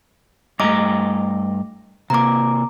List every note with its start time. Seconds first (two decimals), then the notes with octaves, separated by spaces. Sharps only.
0.60 G2 A3 D#5 A#5 D6
2.10 C3 A#3 A#5 D6